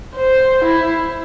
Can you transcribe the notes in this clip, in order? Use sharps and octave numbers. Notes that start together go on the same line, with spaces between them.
C5
E4